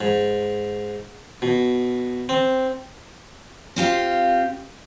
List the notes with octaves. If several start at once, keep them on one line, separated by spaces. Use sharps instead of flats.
G#2
B2
C4
C4 F4 G4 F5